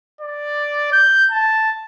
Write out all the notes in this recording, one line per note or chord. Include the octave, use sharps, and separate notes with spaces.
D5
G6
A5